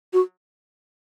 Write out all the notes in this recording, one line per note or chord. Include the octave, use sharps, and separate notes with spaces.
F#4